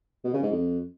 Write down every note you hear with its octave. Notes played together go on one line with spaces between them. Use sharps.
B2
C#3
G#2
F2